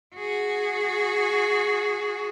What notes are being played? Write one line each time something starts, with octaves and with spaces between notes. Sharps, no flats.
F#4 G#4